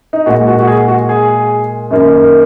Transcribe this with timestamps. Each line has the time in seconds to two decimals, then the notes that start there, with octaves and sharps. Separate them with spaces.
0.13 D#4
0.26 A#2 G#3 F#4
0.47 F#4
0.59 F#4
0.67 G#4
0.88 F#4
1.09 G#4
1.91 F#2 D#3 A#3